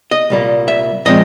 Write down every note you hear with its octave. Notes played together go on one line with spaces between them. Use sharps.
D#5
C2 A#2 G3 A#3
E5
A#2 F3 G#3 C4 D#5